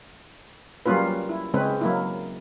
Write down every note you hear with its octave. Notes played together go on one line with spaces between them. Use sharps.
F#3 G3 A#3 C#4 F4 B4
E4
C#3 G#3 C4 C#4 B4
F#3 A#3 E4